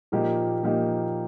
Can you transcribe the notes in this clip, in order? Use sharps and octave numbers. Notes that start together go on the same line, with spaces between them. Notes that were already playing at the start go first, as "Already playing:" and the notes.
A#2 F3 A#3 D#4 G4
A#2 F3 A#3 D#4 G4